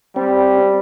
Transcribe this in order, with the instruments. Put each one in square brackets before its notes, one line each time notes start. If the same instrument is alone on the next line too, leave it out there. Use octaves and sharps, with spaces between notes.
[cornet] G3 [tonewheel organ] C4